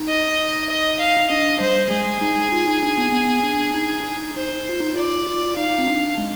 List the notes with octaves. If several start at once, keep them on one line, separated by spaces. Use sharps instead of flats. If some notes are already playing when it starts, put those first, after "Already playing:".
Already playing: D#4
D#5
D#5
F5
D4 D#5
G3 C5
G#3 G#4
D#4
F4
D#4
D4
B3
B3
D4
D#4
D#4
D#4 C5
F4
D#4
F4 D5
F4
D#4 F5
C4
D4
G#3